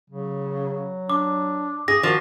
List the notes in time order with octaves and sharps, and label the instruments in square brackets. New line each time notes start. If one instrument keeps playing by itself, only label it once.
[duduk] C#3 [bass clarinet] F#3
[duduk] D4 [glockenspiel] D6
[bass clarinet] G2 [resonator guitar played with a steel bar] G#4 [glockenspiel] A#6
[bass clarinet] D#3 [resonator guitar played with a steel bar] F3 [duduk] F#4